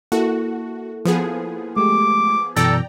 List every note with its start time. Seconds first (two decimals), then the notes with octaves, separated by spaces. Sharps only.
0.12 A#3 E4 F#4 A4
1.05 F3 B3 G#4
1.77 G#3 A3 G4 D6
2.56 F#2 B2 E3 A4 D5 G5 A#5